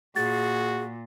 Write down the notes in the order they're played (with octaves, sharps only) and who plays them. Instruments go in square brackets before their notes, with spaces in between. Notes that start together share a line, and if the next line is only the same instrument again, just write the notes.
[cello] A#2 [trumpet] F#4 [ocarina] G#4 [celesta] A6